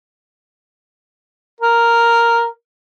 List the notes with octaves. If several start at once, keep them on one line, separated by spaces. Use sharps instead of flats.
A#4